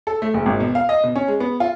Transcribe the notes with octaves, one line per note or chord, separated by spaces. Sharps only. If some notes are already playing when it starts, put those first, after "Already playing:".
A4
A3
F#1
G#1
B2
F5
D#5
B2
C#4
G#3
B3
F4